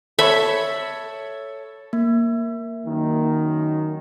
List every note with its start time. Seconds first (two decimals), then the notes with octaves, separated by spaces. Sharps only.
0.19 A4 C#5 E5 B5
1.93 A#3
2.86 F#2 D#3